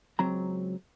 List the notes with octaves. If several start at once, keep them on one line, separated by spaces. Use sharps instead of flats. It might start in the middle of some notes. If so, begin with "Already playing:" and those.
C#2 F#3 C4 A#5